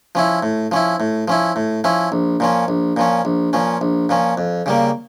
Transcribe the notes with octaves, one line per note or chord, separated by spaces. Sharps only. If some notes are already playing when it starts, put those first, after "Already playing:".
F3 C#4 E4
A2
F3 C#4 E4
A2
F3 C#4 E4
A2
F3 C#4 E4
A#1
A#2 F3 C#4
A#1
A#2 F3 C#4
A#1
A#2 F3 C#4
A#1
A#2 F3 C#4
F2
C#3 G3 A#3